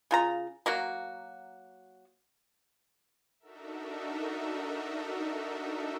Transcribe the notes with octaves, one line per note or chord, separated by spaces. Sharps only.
C#3 F4 A#5
F#3 A#3 F#4
D4 D#4 F#4 A4 A#4 E5